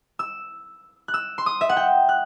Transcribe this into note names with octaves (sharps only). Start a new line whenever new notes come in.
E6
F#6
E6
C6
D#6
E5
F#5
G5
F#6